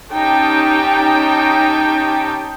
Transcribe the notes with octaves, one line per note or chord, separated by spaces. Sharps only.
C#4 D#4 G4 G5 A5